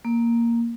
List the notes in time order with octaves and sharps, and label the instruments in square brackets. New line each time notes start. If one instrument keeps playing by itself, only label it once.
[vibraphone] A#3